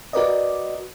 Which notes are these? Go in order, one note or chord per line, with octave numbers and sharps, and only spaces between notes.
F#4 A#4 B4 D5 D#5